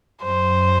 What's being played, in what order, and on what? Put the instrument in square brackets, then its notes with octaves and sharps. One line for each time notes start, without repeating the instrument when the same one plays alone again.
[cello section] F#2 [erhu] C5